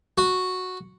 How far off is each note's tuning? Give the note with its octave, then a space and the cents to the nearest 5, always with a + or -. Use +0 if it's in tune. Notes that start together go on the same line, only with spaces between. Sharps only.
F#4 -5